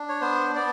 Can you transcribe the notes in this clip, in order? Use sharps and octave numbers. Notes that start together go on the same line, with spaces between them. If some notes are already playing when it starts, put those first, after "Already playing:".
Already playing: D4
C#5
B3 C5
B3 D5